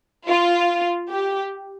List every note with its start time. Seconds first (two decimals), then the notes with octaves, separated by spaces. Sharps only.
0.27 F4
1.09 G4